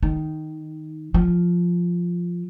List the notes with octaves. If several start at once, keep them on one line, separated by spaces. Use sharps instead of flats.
D#3
F3